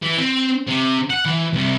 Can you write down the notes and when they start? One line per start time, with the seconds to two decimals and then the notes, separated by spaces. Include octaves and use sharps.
0.02 E3
0.18 C4
0.67 C3
1.10 F#5
1.25 E3
1.53 C2